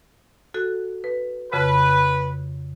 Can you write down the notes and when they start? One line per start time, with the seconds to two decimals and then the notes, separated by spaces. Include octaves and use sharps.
0.54 F#4 A4 F#6
1.04 B4
1.53 F2 C#3 B4